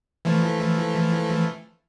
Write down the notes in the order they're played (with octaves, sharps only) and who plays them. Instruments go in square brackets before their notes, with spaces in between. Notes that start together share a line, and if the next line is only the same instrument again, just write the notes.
[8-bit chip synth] E3 F3 A3